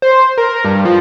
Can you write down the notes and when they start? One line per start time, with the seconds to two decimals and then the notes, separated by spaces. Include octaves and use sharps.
0.02 C5
0.38 A#4
0.65 G2
0.85 F3